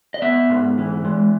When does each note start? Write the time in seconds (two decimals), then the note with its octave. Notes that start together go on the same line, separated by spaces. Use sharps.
0.14 D#5
0.22 B3 E5
0.50 G#2
0.78 E3
1.05 G#3